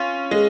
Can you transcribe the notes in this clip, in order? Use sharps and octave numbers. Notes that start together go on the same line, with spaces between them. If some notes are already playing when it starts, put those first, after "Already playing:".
Already playing: C#4 F4
G#3